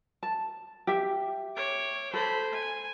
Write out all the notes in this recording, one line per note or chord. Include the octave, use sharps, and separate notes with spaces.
A5
G4 E5
C#5 D6
A4 C5 B5
G#5